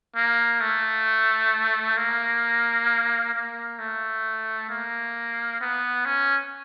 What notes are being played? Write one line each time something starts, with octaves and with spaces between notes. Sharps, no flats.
A#3
A3
A#3
A#3
A3
A#3
B3
C#4